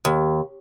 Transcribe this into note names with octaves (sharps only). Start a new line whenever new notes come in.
D#2